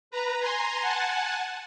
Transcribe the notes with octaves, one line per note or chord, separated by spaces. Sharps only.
B4 A#5
G#5 A#5 C6
F#5 G#5 A5